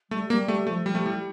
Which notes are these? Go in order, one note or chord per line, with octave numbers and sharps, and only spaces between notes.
G3 A3
G3 A#3
A3
F3 A3
F3 G3
A3
G3 E4